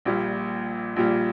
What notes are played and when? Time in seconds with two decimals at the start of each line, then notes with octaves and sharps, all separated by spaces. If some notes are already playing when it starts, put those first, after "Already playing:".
0.05 A#1 A#2 G3
0.96 A#1 A#2 G3